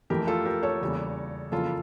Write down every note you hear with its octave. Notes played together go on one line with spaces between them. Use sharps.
F2 E3 A3 G4 A#4
F4 A4
G4 A#4
A4 C#5
E2 C#3 G3 A#3
F2 C#3 E3 A#3 F4 A4